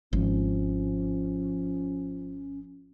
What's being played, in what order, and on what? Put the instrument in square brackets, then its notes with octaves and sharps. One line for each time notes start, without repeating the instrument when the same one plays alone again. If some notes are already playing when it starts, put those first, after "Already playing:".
[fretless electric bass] G#1 [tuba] F3 [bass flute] C#4